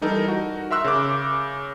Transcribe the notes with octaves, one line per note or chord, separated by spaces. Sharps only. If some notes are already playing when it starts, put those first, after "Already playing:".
E3 G3 D#4 A4 A#4
F#4
A#4 E5 C6 E6 F#6
C#3 D6